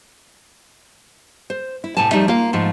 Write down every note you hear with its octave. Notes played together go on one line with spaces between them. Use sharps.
C5
E4
A2 C3 A3 G#5 A5
F3 G3 A3 D#4 E5
A#3 F4 F5
G#2 F3 A3